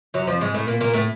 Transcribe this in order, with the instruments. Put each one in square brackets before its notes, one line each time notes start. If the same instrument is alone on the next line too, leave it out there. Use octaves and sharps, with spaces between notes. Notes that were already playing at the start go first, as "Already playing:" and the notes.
[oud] F#2 F#3
F2 F3
G#2 G#3
A2 A3
A#2 A#3
A#2 A#3
A2 A3